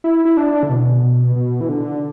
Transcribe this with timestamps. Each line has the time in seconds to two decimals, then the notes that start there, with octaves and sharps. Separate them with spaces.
0.04 E4
0.25 E4
0.37 D4
0.63 D3
0.70 B2
1.03 B2
1.36 B2
1.61 E3
1.69 D3